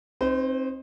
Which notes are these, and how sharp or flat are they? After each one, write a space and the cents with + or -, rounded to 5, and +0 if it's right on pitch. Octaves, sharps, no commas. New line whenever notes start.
C4 +25 D#4 +0 C5 -35